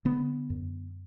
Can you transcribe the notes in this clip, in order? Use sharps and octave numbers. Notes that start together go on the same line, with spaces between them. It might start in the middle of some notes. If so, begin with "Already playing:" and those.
D3 B3
F#2